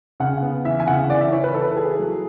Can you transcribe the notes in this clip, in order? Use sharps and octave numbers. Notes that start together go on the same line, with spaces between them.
C#3 F#5
B3
E3 E5
G#5
C#3 F#5
E3 D5
E5
E4 C#5
B4
E4 A4
B4
A4
G#4
F#3